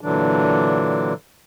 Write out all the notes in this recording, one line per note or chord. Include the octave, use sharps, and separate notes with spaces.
A#2 D3 E3 F#3 D4